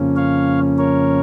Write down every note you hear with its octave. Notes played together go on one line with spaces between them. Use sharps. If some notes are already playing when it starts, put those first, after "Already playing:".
Already playing: F2 C#3 F3 A#3 C#4
C#5 F5
A#4 C#5